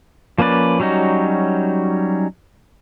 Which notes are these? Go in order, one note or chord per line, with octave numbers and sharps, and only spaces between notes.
F3 A#3 C#4 B4 D5
F#3 G3 C#4 D#4 F#4